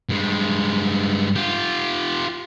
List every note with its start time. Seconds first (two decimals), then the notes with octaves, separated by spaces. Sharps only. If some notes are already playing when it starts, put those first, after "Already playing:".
0.09 G2 G#3
1.36 F4 G4